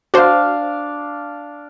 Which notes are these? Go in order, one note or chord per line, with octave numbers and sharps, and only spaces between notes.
D4 F#4 C5 F5